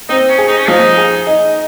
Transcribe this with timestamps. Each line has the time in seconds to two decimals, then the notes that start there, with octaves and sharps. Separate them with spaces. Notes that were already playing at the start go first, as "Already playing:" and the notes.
0.09 C4 D#4
0.29 C#4
0.38 G#4
0.48 D#4
0.58 C#4
0.68 F3 D#4
0.97 G#4
1.27 D#4